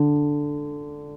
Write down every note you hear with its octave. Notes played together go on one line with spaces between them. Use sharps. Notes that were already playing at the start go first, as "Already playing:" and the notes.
Already playing: D3